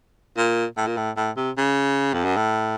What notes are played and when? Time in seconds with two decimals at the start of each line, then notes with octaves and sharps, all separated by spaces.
0.37 A#2
0.77 A2
0.87 A#2
0.97 A2
1.16 A2
1.36 C3
1.57 C#3
2.13 F2
2.24 F#2
2.36 A2